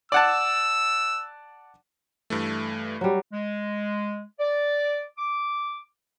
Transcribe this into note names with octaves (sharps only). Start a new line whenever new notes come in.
D5 F#5 A5 E6
G2 E3 A3
F#3 G3
G#3
D5
D6